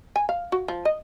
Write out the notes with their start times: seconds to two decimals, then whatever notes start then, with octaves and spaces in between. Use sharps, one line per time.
0.16 G#5
0.29 F5
0.52 F#4
0.68 F3
0.85 D#5